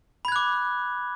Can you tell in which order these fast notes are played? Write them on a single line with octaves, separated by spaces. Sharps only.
B5 G#6 F#6 D6